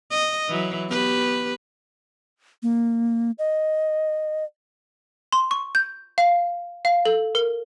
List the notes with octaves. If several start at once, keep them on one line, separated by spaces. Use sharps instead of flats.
D#5
E3 F#3
B3 G4 B4
A#3
D#5
C6
C#6
G6
F5
F5
A4
A#4